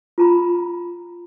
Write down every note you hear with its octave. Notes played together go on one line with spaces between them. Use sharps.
F4 A#5 B5